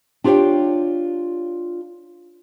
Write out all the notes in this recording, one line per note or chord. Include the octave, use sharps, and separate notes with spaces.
D4 F4 G4 C5 C#5 G5